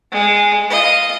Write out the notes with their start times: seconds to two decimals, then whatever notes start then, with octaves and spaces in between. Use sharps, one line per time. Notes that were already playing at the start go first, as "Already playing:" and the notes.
0.12 G#3
0.71 F4 D#5